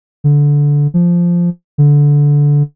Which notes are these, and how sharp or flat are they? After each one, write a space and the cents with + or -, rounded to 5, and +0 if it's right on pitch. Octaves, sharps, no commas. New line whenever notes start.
D3 -15
F3 -5
D3 -15